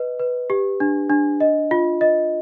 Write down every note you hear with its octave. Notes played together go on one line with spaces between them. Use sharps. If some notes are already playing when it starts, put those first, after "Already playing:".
Already playing: B4 D#5
B4
G4
D4
D4
D#5
F4
D#5